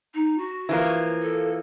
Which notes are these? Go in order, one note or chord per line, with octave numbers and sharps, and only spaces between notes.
D#4
F#4
E3 F3 A#3
A4